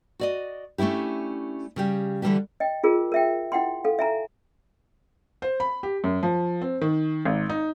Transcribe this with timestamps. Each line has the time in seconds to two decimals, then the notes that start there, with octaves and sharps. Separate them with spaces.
0.19 F#4 D5 D#5
0.78 A3 C#4 D4 E4 G4
1.76 C#3 G3 G4
2.22 D3 E3 G3 A3 D4 G4
2.60 D#5 G5
2.84 F4 G#4 A#4
3.12 A#4 E5 G5
3.52 E4 F#5 G5 C6
3.84 A4 F5
3.99 E5 G#5 A#5
5.42 C5
5.60 B5
5.83 G4
6.04 F#2
6.23 F3
6.61 C4
6.81 D#3
7.25 G#1
7.49 D#4